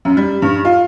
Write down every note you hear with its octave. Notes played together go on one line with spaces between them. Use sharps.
F#2
G3
G2
F4